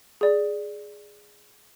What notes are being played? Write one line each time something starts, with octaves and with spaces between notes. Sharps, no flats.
G#4 D5